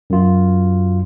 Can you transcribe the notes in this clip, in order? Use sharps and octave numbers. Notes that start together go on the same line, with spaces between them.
F#2 F4